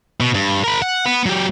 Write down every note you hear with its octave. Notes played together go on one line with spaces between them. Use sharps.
B2
G2
A#4 B5
F#5
B3
F#3 G4